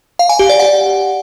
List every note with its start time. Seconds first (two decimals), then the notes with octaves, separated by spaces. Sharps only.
0.19 F5
0.29 G#5
0.39 G4
0.49 D5
0.59 F#5